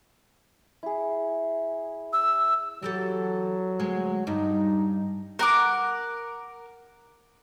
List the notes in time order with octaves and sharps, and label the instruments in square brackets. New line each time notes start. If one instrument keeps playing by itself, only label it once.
[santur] E4 G#4
[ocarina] E6
[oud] E3 G4 A4 [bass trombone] F#3
[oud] D2 G#3 C#5
[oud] G2 [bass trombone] D#4
[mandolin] A#4 F#5 D6